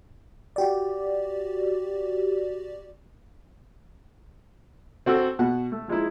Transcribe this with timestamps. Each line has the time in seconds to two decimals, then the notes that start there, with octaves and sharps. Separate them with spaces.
0.56 F#4 G4 D5
5.06 C4 F#4 A4
5.39 B2 F#4 F#5
5.72 A3
5.88 F3 G#3 D#4 E4